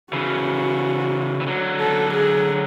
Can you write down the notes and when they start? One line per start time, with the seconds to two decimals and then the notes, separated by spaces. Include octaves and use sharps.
0.13 C#3 E3 F#4
1.40 E3
1.47 D3 F#3
1.80 A4
2.14 G#4